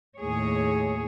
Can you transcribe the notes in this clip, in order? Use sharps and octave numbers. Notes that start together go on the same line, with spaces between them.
D#2 A2 G#4 C#5